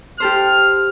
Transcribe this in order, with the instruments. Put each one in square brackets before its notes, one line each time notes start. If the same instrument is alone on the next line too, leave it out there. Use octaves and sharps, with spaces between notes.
[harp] G4 A4 C5 [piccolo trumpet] F6